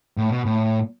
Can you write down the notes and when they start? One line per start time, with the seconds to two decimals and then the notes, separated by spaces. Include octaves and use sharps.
0.17 A2
0.30 B2
0.45 A2